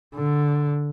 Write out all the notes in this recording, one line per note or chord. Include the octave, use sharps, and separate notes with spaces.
D3